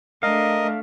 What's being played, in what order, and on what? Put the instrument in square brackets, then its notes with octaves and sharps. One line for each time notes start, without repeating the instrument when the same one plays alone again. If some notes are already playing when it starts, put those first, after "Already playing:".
[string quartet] A3 D4 [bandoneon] A#4 D#5 [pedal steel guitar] F5